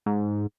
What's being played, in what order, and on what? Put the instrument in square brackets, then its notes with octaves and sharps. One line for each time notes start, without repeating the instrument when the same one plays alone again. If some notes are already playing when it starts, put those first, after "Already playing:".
[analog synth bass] G#2